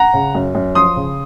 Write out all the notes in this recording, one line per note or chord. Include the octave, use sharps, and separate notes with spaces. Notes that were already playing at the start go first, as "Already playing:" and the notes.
Already playing: F#5 A#5
C#3
F#2
F#2
F3 C6 D#6
C#3